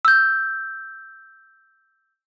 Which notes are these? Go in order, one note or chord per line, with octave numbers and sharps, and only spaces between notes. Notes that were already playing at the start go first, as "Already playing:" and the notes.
E6 G6